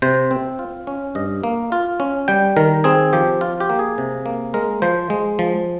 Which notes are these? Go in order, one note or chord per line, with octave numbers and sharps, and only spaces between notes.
C3 C5
C4
F4
C#4
G2 D#5
A#3
F4
C#4
G3 G5
D#3 A#4
C4 G#4
F3 G4
F4
G4
A#3
G#4
C3
A#3
G#3 A#4
F3 C5
G#3
F3